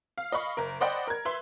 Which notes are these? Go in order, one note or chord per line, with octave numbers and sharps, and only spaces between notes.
F5
D#5 F5 B5 C#6
F#1 A#4
C5 D5 D#5 F#5 G5 B5
A#4 G#6
B4 E5 C6